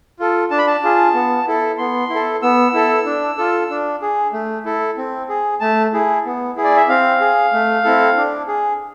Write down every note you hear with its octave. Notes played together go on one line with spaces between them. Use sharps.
F4 A4
D4 A5
B5
A5
F4 G#4
B3
E4 A4
B3 C6
E4
A4
B3 E6
E4 A4
D4
F4 A4
D4
G#4
A3
E4 A4
C4
G#4
A3 A5
E4 G#4
B3
E4 G#4
D5
E5
C4 F5
G#4
A3
C4 E4 A4
D4
G#4